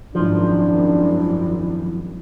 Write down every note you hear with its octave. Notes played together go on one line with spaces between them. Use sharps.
G#1 F#2 F3 D4 E4